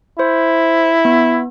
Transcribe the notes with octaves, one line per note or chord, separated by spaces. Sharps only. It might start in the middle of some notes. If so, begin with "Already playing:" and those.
E4 C5
B3